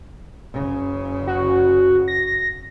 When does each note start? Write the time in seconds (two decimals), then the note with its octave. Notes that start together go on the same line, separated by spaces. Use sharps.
0.54 F#1 C#3
1.27 F#4
2.08 A#6